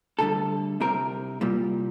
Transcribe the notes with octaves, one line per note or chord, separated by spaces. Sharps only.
D2 D3 G3 A4
C2 C3 G3 A#4
C2 A#2 G3